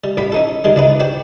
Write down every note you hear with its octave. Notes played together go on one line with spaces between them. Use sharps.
G3
A1 G3 B5
C#4 D#4 A4
F#2 D#3 G3 G#3
C#2 D4 D#4 B4
F#4 C5 D5 G5